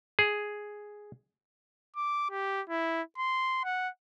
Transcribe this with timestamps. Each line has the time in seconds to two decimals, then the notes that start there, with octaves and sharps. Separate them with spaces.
0.19 G#4
1.96 D6
2.31 G4
2.70 E4
3.18 C6
3.64 F#5